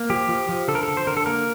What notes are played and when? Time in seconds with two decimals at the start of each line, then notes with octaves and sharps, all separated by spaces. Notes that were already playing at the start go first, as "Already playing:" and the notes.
Already playing: A#3
0.10 F3 G4
0.29 F3
0.49 F3
0.68 D3 A4
0.75 A#4
0.83 D3 A4
0.97 C5
1.07 D3 A#4
1.17 A4
1.26 A#3 A#4